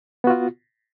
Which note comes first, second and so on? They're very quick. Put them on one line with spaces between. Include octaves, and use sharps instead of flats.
B3 F#4 F4